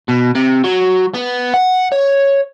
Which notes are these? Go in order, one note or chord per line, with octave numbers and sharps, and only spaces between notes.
B2
C3
F#3
B3
F#5
C#5